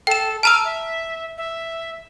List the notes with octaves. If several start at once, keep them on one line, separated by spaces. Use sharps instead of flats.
A4 G5 E7
A5 A#5 E6 F6
E5
E5